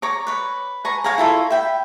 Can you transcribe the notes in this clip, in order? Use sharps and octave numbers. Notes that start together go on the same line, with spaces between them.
C#5 A#5 D6
B4 C#5
B4 G#5 A#5 C#6
C#5 F5 G#5 A#5
E4 F4 A4 C#5
E5 G5 B5